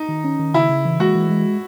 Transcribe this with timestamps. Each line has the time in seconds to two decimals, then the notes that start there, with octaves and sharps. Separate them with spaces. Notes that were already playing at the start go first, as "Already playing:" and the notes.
Already playing: D#4
0.09 D#3
0.24 C#4
0.39 D#3
0.54 C#3 E4
0.69 C#3
0.85 E3
1.00 G#3 F#4
1.15 E3
1.30 G#3